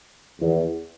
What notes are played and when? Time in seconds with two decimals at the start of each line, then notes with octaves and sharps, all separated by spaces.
0.40 E2